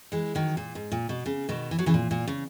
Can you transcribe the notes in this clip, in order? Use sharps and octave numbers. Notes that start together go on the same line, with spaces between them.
E3 G#3
D#3 F#3
A#2
G#2
A#2
B2
C#3
B2 D#3
E3
F#3
C#3 E3
A#2
A#2
C#3